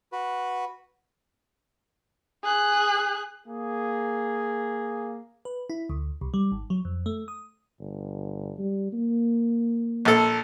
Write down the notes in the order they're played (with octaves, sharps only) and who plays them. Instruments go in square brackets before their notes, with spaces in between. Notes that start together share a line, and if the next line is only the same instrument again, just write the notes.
[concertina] F#4 B4
[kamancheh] G#4 F#6
[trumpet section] A#3 G#4
[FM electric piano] B4
E4
D2
C2
G3
G#1
F#3
F2
A3
D#6
[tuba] G1
G3
A#3
[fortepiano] A#1 A4